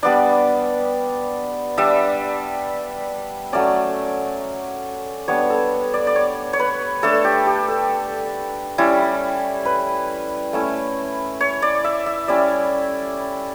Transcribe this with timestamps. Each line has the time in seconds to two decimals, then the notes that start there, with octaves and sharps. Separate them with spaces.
0.03 G3 B3 D4 D5
1.77 G3 D4 E5
3.53 F#3 A3 C#4 D5
5.28 G3 B3 D4 C#5
5.50 A4
5.94 D5
6.07 D5
6.16 C#5
6.53 C#5
6.59 B4
7.03 A3 D4 A4
7.24 G4
7.47 G4
7.68 A4
8.78 G3 C#4 E4
9.65 B4
10.53 A3 C#4 E4
11.41 C#5
11.62 D5
11.84 E5
12.06 E5
12.28 G3 C#4 E4 D5